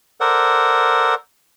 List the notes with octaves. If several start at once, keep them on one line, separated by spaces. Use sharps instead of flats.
A4 A#4 C5 D5 F#5